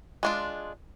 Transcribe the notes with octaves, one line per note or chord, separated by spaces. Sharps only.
G#3 D4 F4